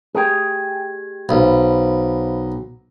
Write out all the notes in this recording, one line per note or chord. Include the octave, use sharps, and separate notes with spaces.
A3 G4 G#4 G5 G#6
B1 C5 F5 B5